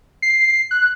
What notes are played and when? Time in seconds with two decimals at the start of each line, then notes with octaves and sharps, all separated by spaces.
0.22 C7
0.71 F#6